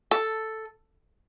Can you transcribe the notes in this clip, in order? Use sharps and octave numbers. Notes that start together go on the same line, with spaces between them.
A4